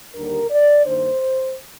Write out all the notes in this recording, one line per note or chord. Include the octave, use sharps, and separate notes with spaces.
D#2 D3 G3 D4 A#4
D5
G2 D#3 A#3 D4 C5